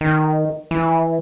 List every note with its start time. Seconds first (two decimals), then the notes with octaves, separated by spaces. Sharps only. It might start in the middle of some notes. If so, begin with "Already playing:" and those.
0.01 D#3
0.71 E3